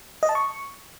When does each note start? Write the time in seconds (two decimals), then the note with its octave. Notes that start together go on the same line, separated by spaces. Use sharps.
0.23 D#5
0.29 A5
0.35 C#6